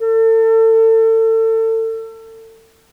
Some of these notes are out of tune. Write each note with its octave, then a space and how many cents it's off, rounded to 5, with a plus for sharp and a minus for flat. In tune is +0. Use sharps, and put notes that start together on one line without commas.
A4 +30